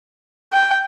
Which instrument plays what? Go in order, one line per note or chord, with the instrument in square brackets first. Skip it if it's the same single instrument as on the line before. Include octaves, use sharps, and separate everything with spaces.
[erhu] G5